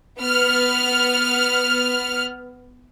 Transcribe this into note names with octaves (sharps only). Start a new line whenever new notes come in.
B3 F6